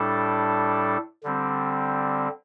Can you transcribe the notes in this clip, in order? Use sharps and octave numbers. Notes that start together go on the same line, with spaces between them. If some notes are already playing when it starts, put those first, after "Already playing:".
Already playing: A2 G3 D4 A4
D3 G3 C4